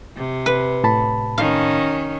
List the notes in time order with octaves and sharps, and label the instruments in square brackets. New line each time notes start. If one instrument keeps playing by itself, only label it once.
[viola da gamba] C3
[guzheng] B4
[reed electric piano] A2 A5 B5
[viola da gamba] D#3 C#4 [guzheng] F5